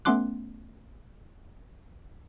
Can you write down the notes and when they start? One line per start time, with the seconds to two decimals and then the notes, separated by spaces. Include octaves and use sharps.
0.05 A3 B3 C#4 C6 D6 F#6